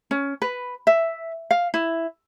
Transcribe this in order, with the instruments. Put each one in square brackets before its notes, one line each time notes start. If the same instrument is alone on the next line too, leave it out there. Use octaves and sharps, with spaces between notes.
[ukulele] C#4
B4
E5
F5
E4